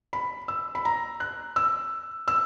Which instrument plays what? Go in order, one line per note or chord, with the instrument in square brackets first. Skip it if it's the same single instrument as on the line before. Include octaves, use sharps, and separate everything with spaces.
[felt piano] B5
E6
B5
A#5
F#6
E6
E6